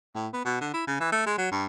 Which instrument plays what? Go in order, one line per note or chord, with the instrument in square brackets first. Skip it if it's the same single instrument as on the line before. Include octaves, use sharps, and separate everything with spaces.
[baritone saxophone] A2
B3
B2
D3
E4
C#3
E3
A3
G#3
F#3
G2